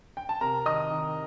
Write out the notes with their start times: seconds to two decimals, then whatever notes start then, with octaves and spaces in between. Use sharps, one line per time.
0.17 G5
0.29 A5
0.41 C3 A#4 A#5
0.66 D#3 D#5 D#6
0.91 D#3